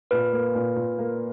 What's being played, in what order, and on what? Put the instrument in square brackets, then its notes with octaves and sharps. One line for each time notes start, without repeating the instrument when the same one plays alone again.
[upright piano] A#2 [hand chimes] B4
[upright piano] A#3
A#2
A#2
A#3